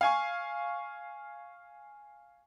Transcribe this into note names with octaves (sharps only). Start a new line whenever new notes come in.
F5 G#5 C#6